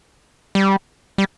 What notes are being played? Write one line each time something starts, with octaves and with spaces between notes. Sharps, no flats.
G3
G3